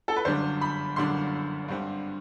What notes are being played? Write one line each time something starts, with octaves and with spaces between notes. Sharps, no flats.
A4
B4
G1 F#2 D3 G3 D4 C5
B5
G1 F#2 D3 G3 D4 C6
G2 D3 G3 C4